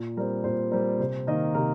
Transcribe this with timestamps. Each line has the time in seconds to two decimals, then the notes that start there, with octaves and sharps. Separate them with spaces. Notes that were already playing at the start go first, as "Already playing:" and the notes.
Already playing: A#2
0.17 G3 C4 A#4
0.44 A#2 C5
0.72 G3 C4 A#4
0.99 C3 C5
1.27 D#3 A#3 D#5
1.55 C3 A#4